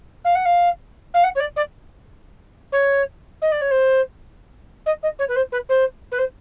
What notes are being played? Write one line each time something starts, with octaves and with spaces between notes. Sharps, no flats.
F5
F#5
F5
F5
F#5
C#5
D5
D5
C#5
D#5
D5
C#5
C5
D#5
D#5
C#5
B4
C5
B4
C5
B4
C5